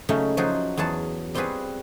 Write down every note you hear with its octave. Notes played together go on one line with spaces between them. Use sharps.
C#3 F#3 A3 C#4 D#4
F3 F#3 D#4 F#4 G#4
E2 F#3 G#4 F#5 A5
G3 C4 F4 F#4 G#4 B4